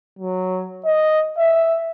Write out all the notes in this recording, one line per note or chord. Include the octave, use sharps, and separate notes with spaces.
F#3
D#5
E5